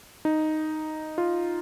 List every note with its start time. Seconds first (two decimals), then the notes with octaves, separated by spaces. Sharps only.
0.25 D#4
1.18 F4